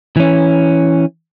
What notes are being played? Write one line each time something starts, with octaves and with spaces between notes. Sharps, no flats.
E3 C#4